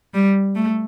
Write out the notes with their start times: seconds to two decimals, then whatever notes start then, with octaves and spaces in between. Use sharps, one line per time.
0.14 G3
0.55 A3